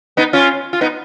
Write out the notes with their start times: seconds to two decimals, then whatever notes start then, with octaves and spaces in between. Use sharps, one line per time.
0.17 B3 D#4
0.33 C#4 F4
0.73 F4
0.81 B3 D#4